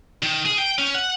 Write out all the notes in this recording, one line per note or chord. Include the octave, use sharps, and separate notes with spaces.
D#3
G#4
G5
C#4
F#5